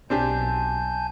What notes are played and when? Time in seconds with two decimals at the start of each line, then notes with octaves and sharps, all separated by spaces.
0.10 B1 C4 D4 G4 G#5 A5 G6